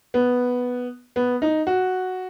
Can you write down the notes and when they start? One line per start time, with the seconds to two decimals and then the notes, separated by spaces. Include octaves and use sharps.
0.14 B3
1.16 B3
1.42 D#4
1.67 F#4